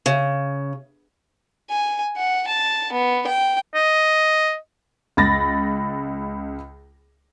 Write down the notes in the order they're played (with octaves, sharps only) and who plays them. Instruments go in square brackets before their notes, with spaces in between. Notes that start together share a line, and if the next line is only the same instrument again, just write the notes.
[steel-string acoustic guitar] C#3
[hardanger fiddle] G#5
F#5
A5
B3
G5
[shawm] D#5
[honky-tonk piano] C#2 B5 A6 A#6